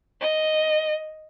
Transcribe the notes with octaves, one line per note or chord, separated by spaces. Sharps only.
D#5